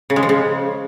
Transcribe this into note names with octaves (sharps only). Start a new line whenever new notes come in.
C#3
G#3
F3
C#3